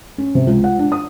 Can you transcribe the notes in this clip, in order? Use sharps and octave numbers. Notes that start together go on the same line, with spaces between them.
C#4
C3
C#2
F#5
D4
D#6